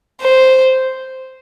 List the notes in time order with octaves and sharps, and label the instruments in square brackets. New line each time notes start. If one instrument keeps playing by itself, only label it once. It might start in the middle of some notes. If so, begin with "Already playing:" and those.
[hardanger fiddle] C5